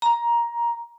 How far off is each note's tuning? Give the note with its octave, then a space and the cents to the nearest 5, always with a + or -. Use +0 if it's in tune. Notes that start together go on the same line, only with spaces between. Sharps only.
A#5 +15